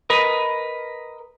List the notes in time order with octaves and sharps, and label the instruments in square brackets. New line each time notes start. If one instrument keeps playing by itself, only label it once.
[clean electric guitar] A#4 B4 D#5